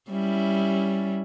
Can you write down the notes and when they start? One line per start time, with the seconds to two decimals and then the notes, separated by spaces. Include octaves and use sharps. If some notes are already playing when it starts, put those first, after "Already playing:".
0.10 G3 C#4 E4